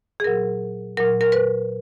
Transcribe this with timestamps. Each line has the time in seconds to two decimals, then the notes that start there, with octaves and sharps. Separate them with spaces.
0.20 G#4
0.24 A#2 F#3 A#4
0.97 A#2 F#3 A#4
1.21 A#4
1.32 B4